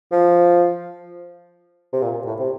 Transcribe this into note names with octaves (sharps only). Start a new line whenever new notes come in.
F3
C3
A#2
A2
C3